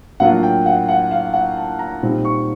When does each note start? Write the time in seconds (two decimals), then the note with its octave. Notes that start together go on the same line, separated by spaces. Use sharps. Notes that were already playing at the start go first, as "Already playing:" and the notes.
0.20 A2 F#3 A#3 D4 F4 F#5
0.43 G5
0.66 F#5
0.89 F#5
1.11 F5
1.34 F#5
1.57 A5
1.79 A#5
2.03 A#2 G3 C4 D#4
2.25 C#6